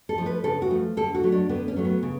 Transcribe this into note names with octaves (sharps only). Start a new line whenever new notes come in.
A4
F3 A3
B4
C#3 A4
F#4
F3 A3
D3 A4
F#4
F#3 A3
D4
D3 B3
C#4
F#3 A3
B3
C#3